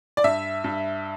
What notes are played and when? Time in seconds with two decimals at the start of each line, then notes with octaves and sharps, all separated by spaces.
0.17 D5
0.24 G2 E5
0.64 G2